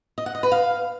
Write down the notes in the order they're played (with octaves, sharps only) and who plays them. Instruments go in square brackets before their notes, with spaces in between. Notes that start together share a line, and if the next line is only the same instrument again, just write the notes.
[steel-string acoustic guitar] D#5
F#5
D#5
B4
F5